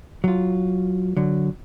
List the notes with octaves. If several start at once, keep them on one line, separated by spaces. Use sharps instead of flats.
F#3 F4
D3 F#3